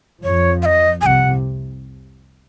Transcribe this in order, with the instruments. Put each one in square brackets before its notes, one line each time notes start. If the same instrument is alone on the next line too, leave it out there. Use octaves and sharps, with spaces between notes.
[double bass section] F2 F3 [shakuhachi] C#5
[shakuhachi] F5
D#5
[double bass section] C2 C3 [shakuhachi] F#5 G#5